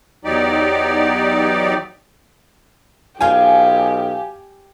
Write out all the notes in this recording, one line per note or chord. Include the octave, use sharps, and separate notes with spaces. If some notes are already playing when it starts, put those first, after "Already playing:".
E2 F#3 D#4 G4 D5
B1 F4 G4 F5 G5 G#5